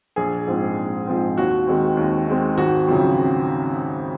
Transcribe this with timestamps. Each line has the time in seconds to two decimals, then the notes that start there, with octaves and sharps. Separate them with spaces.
0.16 A#1 G#4
0.47 G#2 F3 C4
0.77 A#1
1.07 G#2 F3 C4
1.37 D#2 F#4
1.67 D#3 G#3 C4
1.97 D#2
2.28 D#3 G#3 C4
2.57 G#1 F#4
2.87 F#2 C#3 F3 C4